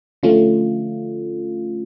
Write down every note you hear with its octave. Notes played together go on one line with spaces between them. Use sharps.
D3 F3 A3 C#4 F4